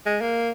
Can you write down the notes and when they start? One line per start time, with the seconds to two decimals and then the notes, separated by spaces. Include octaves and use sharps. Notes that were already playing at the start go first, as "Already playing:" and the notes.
0.06 G#3
0.21 A#3